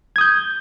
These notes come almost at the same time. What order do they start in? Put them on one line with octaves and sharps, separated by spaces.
G#6 D#6 G6